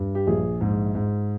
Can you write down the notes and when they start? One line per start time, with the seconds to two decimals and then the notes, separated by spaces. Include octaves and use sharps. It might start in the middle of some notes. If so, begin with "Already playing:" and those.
Already playing: G2
0.15 G4
0.27 A#1 G#4
0.61 G#2
0.95 G#2